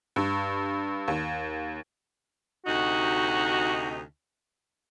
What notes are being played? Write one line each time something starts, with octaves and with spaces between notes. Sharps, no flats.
G2
D#2
D2 C3 D#4 F#4